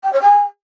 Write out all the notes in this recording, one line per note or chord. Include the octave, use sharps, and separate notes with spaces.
G5
C#5
G#5